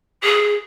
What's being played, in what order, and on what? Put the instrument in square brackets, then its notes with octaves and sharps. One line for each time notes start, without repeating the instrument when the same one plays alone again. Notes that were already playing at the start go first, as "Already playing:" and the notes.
[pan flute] G#4